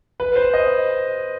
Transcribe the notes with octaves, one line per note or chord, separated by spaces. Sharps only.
B4
C5
D#5